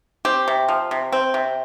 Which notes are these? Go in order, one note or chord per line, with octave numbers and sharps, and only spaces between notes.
C4 G4
C3
F3
C3
C4
C3